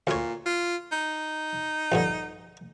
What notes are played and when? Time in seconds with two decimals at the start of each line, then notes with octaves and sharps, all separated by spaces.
0.07 D2 A#2 C#5
0.46 F4
0.92 D#4
1.92 A#1 G2 D3